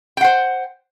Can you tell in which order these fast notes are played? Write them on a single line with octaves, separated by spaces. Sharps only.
G5 F#5 C5